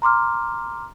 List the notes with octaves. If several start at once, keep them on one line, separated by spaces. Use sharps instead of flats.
A#5 C6 D6 F6